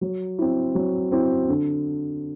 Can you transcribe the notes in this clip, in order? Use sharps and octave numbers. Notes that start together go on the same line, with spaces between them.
F#3
C4 E4
F#3
C4 E4
D3